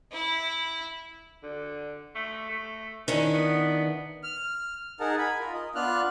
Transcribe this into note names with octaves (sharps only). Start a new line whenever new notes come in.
E4
D3
A3
A3
D#3 C#4 D4 E4
B3
F6
D#4 G#4 A#4 F#5 A5
G#5 B5
F4 A#4
D#5
B3 D4 F4 F6 F#6